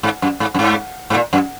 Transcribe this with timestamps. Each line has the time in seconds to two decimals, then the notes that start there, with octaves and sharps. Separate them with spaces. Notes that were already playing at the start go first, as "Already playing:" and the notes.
0.03 G#2
0.22 F#2
0.40 G#2
0.54 F#2
0.59 G#2
1.10 G#2
1.14 A#2
1.33 F#2